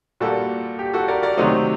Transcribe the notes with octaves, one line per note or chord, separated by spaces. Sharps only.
A#2 G3 A#3 F#4 A4
G4
F#4 A4
A#4 D5
A#4 D5
C3 D#3 F#3 A3 C5 D#5